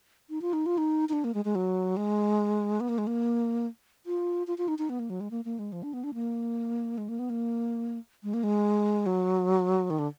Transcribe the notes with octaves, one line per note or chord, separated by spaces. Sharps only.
D#4
F4
D#4
F4
D#4
D#4
D4
A#3
G#3
G#3
F#3
G#3
B3
A#3
G#3
A#3
F4
F4
F4
D#4
D#4
B3
A#3
F#3
G#3
A#3
A#3
G#3
F3
D4
B3
D4
A#3
G#3
A#3
B3
A#3
G#3
A#3
G#3
F#3
D#3
D3